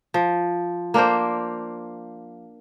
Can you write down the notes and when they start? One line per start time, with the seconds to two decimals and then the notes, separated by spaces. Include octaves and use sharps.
0.14 F3
0.94 A#3 D4 A#4 C5